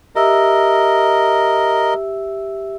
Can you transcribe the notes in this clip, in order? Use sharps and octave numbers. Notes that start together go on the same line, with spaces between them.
G4 A#4 D#5 E5 E6